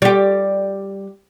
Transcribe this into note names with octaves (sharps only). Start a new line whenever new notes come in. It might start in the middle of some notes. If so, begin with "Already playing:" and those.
G3 G4